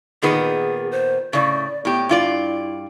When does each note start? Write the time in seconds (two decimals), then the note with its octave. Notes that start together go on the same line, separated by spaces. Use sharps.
0.22 A#2 D#3 B3 G#4
0.92 C5
1.33 A2 C#3 D5
1.85 A2 B3 G4
2.09 G2 E4 F4 D5